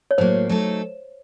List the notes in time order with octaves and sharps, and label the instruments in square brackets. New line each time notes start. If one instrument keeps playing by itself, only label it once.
[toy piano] C#5
[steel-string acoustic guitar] A2 F#3 A#3 [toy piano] C5
[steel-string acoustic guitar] F#3 A3 D#4 A4